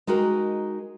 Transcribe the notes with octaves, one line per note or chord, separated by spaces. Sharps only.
G#3 D#4 F#4 A#4 G5